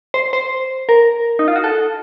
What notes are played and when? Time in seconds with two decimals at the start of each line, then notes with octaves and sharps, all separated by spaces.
0.14 C5
0.33 C5
0.89 A#4
1.39 D#4
1.48 F4
1.56 F#4
1.64 A4